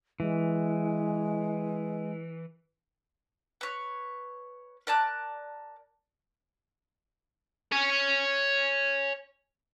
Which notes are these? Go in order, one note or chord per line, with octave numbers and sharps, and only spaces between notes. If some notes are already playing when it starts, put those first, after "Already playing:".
E3 G#3
B4 C#5
A#4 D5 A5 F#6
C#5 G#5